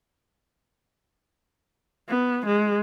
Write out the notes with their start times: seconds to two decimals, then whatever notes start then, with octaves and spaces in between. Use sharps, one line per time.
2.09 B3
2.46 G#3